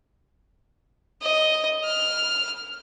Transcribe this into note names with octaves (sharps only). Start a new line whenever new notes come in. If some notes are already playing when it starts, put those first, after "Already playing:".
D#5
F6